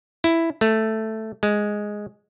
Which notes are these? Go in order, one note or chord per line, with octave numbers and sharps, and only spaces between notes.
E4
A3
G#3